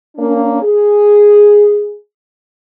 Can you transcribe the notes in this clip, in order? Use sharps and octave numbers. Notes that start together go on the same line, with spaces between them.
A#3 C#4 D4
G#4